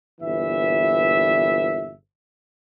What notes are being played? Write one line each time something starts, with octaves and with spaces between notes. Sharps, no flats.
G1 A#2 E3 E5